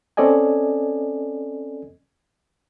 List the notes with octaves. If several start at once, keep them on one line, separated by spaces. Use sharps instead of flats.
C4 C#4 A4 D5 D#5 G#5